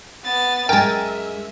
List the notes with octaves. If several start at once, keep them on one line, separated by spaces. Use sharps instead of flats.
B3 A6
F#2 G#3 A#4 E5 G5 G#5 A6